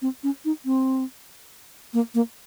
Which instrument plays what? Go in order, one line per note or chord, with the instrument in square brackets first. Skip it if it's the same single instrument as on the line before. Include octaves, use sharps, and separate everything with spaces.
[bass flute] C4
C#4
D#4
C4
A#3
A#3